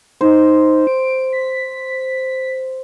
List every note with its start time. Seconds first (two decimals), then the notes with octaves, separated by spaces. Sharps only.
0.21 D#4 C5
0.87 D7
1.33 B6